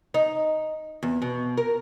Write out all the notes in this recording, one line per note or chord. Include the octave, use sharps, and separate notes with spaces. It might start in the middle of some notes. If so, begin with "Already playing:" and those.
D#4
E2
B2
A#4